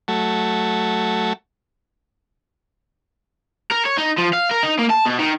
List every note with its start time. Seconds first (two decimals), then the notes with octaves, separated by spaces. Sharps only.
0.08 F#3 A3
3.72 A#4
3.86 C#5
3.98 D#4
4.18 F3
4.33 F5
4.51 A#4
4.63 D#4
4.78 A#3
4.90 A5
5.05 B2
5.19 D#3